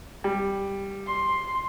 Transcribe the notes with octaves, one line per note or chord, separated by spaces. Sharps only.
G3
C6